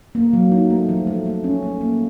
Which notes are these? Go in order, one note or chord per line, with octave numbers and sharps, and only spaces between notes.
A#3
F#3
D#4
A3
F3
A3
A3
C#4
A3
A#3